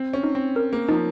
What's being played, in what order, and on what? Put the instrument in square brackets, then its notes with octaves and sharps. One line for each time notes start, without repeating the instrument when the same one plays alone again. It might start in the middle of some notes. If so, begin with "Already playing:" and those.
Already playing: [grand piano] C4
C#4
[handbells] D#4
[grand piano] C4
[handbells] A#4
[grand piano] A#3
[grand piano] F3 [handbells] D#4